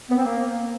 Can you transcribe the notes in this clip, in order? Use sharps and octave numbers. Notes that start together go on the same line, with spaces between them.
B3
C4
A#3